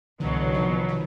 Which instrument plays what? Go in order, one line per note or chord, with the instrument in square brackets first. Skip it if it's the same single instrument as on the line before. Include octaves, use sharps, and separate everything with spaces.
[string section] C2 B2 F#3 [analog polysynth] D3 E3
[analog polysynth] D#3 F3
D#3 F3